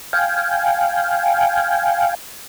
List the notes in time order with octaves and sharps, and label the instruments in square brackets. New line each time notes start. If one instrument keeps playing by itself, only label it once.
[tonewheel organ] F5 G5 G#5